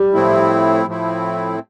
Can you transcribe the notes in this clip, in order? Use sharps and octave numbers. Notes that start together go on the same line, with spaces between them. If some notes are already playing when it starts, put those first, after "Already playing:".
Already playing: G3
A2 F3 A3 C4 E4
A2 F3 A3 C4 E4